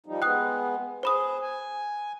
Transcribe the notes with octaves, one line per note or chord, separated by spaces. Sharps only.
F3 G3 D#4
G#3 B3 G5 D#6 F#6
G#4 C5 B5 D#6
G#5